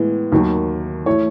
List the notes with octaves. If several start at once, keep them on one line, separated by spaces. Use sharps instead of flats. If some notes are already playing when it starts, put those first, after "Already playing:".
Already playing: A2 E3 G#3 B3
D#2 D#3 F#3
E3 A3 E4 C#5